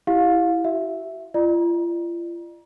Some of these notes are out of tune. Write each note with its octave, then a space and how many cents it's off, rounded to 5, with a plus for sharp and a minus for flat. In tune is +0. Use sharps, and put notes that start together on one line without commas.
E4 +5 G4 +0 F5 +25
F#4 +40 E5 +0
F4 -40 D5 +45 A#5 +30